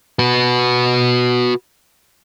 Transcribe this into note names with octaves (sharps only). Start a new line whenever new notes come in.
F#4 B4